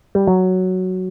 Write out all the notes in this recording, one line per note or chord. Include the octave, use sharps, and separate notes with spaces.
G3
F#3